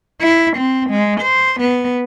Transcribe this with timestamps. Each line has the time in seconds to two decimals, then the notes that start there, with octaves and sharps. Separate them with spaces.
0.21 E4
0.57 C4
0.90 G#3
1.21 C5
1.61 B3